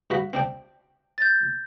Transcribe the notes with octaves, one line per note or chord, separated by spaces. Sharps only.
G2 F#4 B5
C4 D4 G5
G6 A6